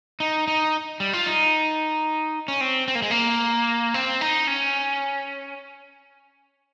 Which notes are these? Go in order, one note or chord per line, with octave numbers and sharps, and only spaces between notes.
D#4
D#4
G3
F4
D#4
C#4
C4
C4
A#3
G#3
A#3
C4
D#4
C#4